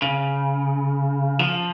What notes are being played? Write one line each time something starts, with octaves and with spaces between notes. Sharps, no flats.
C#3
F3